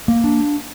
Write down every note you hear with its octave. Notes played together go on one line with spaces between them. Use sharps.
A#3
D4